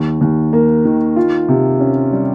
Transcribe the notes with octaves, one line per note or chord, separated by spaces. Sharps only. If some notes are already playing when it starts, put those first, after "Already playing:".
Already playing: D#2
D#2
A#3
D#3
F4
C3
C#4
G3